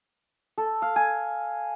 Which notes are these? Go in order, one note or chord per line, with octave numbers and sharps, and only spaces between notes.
A4
F5
G#5